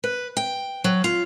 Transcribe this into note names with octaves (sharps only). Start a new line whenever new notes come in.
B4
G5
F#3
F4